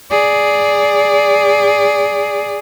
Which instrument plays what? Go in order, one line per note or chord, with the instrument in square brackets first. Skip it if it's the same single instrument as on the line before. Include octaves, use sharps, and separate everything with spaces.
[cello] G#4 D5